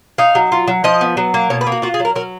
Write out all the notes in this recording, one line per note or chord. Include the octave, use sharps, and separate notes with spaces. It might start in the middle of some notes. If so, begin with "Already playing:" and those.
D#4 F5
F#3
F4
F#3
F3 D#5
B3
F#3
A#3
B2 C#5
B4
A#3
F#4
F4 F#4
G#4
F#3
A#4
F#3 A#4